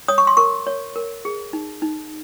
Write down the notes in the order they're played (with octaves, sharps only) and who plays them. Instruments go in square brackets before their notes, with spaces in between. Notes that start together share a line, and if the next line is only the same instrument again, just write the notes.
[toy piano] C#5 D#6
C#6
C6
A#4 C#6
C#5
A#4
G#4
D#4
D#4